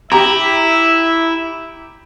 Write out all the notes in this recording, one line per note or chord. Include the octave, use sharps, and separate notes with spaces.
E4 G4 E5 A#5